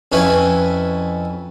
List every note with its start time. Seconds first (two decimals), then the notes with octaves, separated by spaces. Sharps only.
0.12 F2 C#4 E4 B4